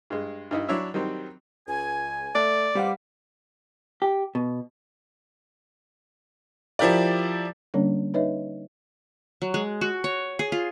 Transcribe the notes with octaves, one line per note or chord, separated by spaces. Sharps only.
G2 G#3
G2 D#4 E4
F#3 D4 E4 C#5 E5
D#3 F#3 G3 C4
C#2 G#5
A3 D5
G3 B4 C5 F5 F#5 D6
G4
B2
F3 E4 G4 A#4 D5
D3 G3 A#3 C#4 D4 C#5
D#4 B4 C#5 D#5 E5
F#3
G#3
F#4
C#5
G#4
F4